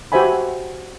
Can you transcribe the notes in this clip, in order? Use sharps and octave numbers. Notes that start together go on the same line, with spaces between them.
F#4 G4 C5 E5 G#5 B5